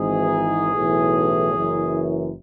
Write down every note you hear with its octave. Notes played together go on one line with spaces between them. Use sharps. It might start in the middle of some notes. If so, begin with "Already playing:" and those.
Already playing: G#1 G#2 E3 G#4
B1 A2 E3
F#1 F#2 E3